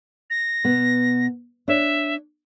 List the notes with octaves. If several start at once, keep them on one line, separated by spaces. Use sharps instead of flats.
A#6
B2 B3
D4 C#5 E5